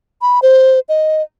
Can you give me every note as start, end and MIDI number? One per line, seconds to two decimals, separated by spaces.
0.22 0.39 83
0.42 0.80 72
0.89 1.22 75